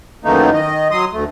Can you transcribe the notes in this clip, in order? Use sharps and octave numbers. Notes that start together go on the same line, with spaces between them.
F#2 D#3 E3 A3 A#3 D#4
D#3 D#5
F#3 C6 D#6
D2 A3